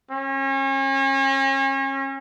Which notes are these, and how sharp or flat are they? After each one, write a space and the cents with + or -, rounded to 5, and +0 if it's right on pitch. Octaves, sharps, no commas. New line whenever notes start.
C#4 -35